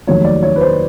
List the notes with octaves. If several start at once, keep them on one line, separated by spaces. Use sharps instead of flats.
F1 D#2 D#3 F#3 C#5
D5
C#5
B4
C5